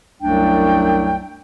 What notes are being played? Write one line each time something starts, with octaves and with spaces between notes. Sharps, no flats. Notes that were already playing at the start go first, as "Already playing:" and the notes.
C2 F#2 F#3 A3 D4 G5